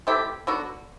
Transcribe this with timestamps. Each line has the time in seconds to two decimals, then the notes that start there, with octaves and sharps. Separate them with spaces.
0.07 E3 A3 C4 G4
0.47 D3 F#3 B3 F#4